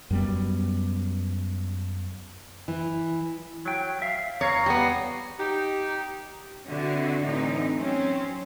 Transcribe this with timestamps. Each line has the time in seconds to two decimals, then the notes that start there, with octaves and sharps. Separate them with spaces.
0.11 F#2 G3 B3
2.68 E3
3.65 F#3 G5
4.02 E5 F5
4.41 E2 C#5 F5 A#5
4.66 G3 B3
5.39 D#4 G4
6.68 B2 D3 C4 E4 F#4
7.25 A2 D3 E3 C4 D#4
7.75 F#3 C4 C#4